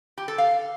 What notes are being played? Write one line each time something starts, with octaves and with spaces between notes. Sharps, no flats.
G4
A4
F5